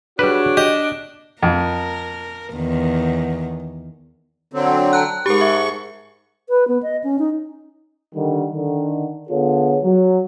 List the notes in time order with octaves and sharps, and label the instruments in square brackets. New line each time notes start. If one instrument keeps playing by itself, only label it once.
[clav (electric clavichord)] G3 B4 [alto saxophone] D4 [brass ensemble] F#4 G#4 C#5
[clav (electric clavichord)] G4 [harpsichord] D#5
[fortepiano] F2 [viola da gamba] A#4
[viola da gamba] E2 D#3
[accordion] D3 F#3 C4
[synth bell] A5 A#5 F#6
[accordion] G#2 C#6 [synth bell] G4 A#4
[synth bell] E5
[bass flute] B4
B3
D#5
C#4
D#4
[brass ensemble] D3 D#3 G3
D3 D#3
D3 B3 F4 G#4 A4 C#5
F#3